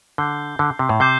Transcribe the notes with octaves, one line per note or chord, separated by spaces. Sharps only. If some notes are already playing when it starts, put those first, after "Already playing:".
D3 G6 C7 G7
D3
C3
A2
C3 D6 G6 C7 G7